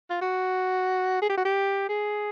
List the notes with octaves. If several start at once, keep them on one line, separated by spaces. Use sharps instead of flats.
F4
F#4
G#4
G4
F#4
G4
G#4